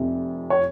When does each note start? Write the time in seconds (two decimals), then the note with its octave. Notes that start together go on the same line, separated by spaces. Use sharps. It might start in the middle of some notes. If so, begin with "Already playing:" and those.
Already playing: F1 F2 C3
0.50 C#5